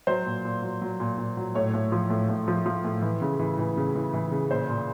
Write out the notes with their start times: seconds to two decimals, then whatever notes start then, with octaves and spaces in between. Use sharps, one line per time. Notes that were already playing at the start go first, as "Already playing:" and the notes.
0.07 F#3 C5
0.26 A#2
0.45 A#2
0.62 F#3
0.82 F#3
1.00 A#2
1.18 A#2
1.37 F#3
1.55 A2 C#5
1.74 A2
1.92 F3
2.10 A2
2.29 A2
2.48 F3
2.66 F3
2.84 A2
3.02 E3
3.22 C#3
3.39 E3
3.59 E3
3.77 C#3
3.95 E3
4.13 E3
4.32 C#3
4.50 A#2 C5
4.69 A#2